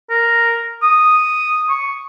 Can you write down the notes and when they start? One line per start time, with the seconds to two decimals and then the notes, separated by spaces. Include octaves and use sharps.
0.10 A#4
0.83 D#6
1.70 C#6